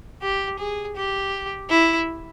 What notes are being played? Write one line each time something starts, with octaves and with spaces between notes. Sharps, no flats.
G4
G#4
G4
E4